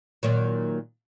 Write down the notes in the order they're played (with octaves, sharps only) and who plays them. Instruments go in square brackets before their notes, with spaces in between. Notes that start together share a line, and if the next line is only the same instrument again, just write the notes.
[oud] A#2 D#3 F#3